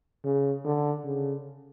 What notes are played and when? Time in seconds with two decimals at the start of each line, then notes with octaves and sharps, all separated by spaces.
0.24 C#3
0.65 D3
1.04 C#3